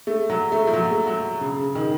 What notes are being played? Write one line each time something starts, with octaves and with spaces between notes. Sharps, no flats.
A3
F#3
A3
F3
F#3
A3
F#3
C#3
C#3
D#3